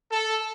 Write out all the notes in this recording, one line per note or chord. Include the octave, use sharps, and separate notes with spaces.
A4